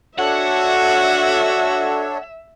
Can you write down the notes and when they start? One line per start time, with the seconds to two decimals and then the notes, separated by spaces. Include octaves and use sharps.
0.19 D4 F#4 A4 C#5 E5 F#5